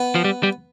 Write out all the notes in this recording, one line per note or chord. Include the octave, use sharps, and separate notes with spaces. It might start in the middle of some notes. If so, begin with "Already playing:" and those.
Already playing: B3
F3
G3
G3